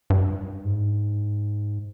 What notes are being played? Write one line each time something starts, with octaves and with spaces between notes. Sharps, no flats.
G2
G#2